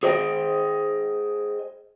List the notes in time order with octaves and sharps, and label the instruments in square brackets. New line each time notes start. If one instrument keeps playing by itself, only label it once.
[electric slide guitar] G#4 C5 D#5 G5